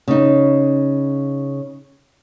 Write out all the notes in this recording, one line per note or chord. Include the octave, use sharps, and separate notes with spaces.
C#3 D#4